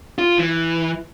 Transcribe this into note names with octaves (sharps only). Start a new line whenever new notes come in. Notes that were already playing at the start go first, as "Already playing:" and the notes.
F4
E3